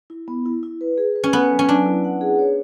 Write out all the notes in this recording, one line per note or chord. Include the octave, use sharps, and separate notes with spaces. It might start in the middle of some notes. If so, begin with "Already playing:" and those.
E4
B3
E4
E4
B4
G#4
B4
C#4
B3 A4
F#3
C#4
F#3 D4
E4
F#5
G#4
C#5